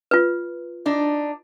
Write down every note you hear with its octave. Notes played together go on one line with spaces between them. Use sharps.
F4 B4
D4 D#4